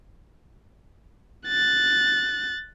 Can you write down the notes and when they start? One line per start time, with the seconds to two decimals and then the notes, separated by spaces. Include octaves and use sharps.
1.48 F#6 A6